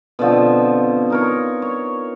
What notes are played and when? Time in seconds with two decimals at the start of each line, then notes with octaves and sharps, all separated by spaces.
0.19 B2 D3 F3 C4
1.10 D#4 A#4 C#5
1.62 C#5